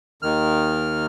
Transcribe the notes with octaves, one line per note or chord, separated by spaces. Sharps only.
D#2 D#3 F6